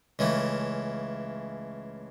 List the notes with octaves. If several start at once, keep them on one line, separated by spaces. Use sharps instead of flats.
C#2 C#3 E3 A3